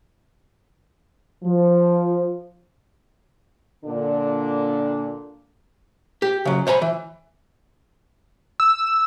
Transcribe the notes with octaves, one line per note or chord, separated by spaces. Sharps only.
F3
A#2 D3 D4
G4
C#3 F#3
C5 C#5 G#5 A#5 B5
E3
E6